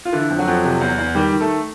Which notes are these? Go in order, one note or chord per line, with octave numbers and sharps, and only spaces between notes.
F4
D3 E3 E4
F2
F#3 F#4
F2
C3
E2
E2
D#3 G3 G4
D#3
A3 A4